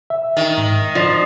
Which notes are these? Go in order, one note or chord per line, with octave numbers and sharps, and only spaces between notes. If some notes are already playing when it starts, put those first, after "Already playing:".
E5
D#3
G#2
F3 D5